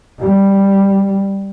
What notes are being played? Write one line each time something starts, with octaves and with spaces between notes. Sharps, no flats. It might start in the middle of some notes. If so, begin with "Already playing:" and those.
G3